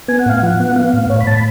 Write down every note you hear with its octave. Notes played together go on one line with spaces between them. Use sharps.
B3 G#5
F#5
A2 F5
F3 F#5
B3
B3 F5
A2
A2 C#5
B5
A2 A5
B5